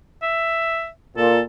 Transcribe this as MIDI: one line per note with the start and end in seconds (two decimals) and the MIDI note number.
0.22 0.88 76
1.17 1.41 46
1.17 1.40 69